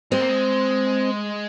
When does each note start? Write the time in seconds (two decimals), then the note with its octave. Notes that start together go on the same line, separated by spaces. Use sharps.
0.12 G#3 C4
0.21 A#3
0.29 G#3